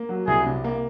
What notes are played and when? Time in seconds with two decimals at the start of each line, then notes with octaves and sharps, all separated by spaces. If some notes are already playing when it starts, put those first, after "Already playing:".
Already playing: A#3
0.09 F#3
0.27 C2 G#4
0.46 C3
0.64 A#3